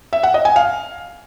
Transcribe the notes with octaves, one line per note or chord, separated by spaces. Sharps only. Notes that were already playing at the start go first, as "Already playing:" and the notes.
E5
F#5
D#5
G#5
F5